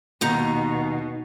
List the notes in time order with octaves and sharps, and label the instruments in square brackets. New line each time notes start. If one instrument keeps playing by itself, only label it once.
[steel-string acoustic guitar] D#2 D#4 A#5 [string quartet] B2